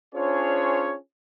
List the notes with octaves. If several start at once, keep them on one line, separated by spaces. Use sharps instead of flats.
C#4 D4 F4 G#4 C5 C#5